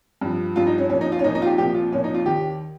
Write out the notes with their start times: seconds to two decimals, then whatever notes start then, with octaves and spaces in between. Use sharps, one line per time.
0.21 G2 F3
0.56 G2 F3 F4
0.67 D#4
0.78 C#4
0.89 C2 A#2 F3 C#4
1.01 D#4
1.12 F4
1.19 C#4
1.24 C2 A#2 F3 D#4
1.35 D#4
1.42 F4
1.46 G4
1.58 C2 A#2 F3 G4
1.75 F4
1.91 C2 A#2 F3 C#4
2.04 D#4
2.14 F4
2.26 D#2 D#3 G4